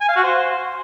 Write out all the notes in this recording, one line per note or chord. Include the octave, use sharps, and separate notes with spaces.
G#5
F5
F#4
C5